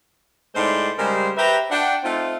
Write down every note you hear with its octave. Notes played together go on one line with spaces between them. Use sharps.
A2 G#3 D#4 C5 D5 C6
C#3 G3 G#3 A#4 C5
G4 B4 C5 E5 A#5
D4 F#5 G5
A3 C4 D#4 F4